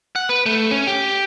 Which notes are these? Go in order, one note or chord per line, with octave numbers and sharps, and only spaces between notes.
F#5
B4
A3
C#4
G4